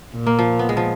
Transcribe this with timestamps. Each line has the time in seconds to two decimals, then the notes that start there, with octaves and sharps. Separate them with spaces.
0.15 A#2
0.26 A#3
0.39 F3
0.59 B3
0.69 G#3
0.77 F3